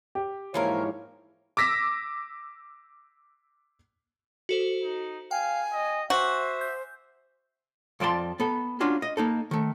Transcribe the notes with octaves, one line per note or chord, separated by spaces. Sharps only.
G4
G#2 E3 F3 A#3 E4 A#4 C#5
D6 E6 A#6 B6
F#4 A4 C5
D#4
F5 G5 G#5
D#5
F#4 C5 E5 G#5 D6
G6
F2 F3 D5 A5 C6
B3 A4
C#4 D4 F4 F#4
D#5
A#3 D#4 A4
D#3 A3